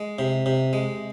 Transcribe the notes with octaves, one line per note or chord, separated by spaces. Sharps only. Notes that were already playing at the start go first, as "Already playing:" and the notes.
Already playing: G#3
C3
C3
G#3